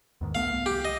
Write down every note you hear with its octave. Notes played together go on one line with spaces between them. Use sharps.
E2 G#2 D#3
C2 A3 B3 F5
C2
G4
D#5